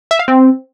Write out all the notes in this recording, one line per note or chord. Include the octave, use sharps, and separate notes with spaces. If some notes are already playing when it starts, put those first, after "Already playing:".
E5
F5
C4